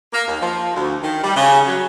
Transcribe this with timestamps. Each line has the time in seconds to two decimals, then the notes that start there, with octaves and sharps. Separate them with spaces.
0.13 A#3
0.28 D#2
0.41 F3
0.75 D2
1.03 D#3
1.23 G3
1.36 C#3
1.66 F#3